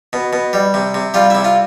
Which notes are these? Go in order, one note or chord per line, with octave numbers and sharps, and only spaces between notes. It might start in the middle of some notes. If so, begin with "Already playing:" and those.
B2
B2
G3
C3
C3
G3 F4
C3 E4
F4